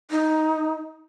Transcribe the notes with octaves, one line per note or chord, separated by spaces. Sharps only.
D#4